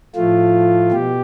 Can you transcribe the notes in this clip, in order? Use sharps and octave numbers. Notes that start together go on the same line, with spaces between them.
A2 F3 A3 F4
B2 G4